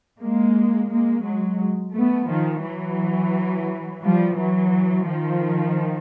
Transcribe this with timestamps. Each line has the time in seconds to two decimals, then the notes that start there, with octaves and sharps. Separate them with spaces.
0.20 G#3 A#3
0.90 G#3 A#3
1.24 F#3 G#3
1.94 A3 B3
2.29 D#3 F3
2.64 E3 F#3
4.03 F3 G3
4.38 E3 F#3
5.08 D#3 F3